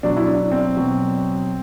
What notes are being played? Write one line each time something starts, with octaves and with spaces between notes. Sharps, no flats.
B2 F#3 D4
E4
D4
C4
B2 F#3